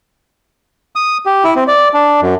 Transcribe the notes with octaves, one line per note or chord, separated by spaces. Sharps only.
D#6
G4
E4
C4
D5
D4
F#2